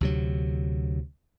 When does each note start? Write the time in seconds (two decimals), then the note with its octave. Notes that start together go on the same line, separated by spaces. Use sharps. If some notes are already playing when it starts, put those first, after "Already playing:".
0.01 D2 C3 F#3